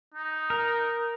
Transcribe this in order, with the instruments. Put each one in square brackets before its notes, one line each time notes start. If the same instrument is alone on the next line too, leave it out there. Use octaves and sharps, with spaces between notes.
[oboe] D#4
[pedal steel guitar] A#4